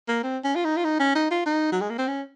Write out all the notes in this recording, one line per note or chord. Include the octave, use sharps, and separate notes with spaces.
A#3
C4
C#4
F4
D#4
F4
D#4
C#4
D#4
F4
D#4
F#3
G#3
A#3
C4
C#4